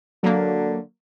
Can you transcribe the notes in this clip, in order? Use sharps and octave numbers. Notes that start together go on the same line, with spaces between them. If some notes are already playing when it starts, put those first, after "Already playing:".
D3 F#3 A#3